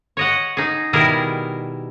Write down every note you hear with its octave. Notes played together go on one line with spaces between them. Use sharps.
C#5 D#5 F#5
D#4 G#4
B2 D#3 G3 E4 G#4 A#4